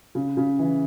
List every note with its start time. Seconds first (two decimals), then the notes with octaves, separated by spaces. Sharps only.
0.15 C#3
0.37 C#3
0.59 E3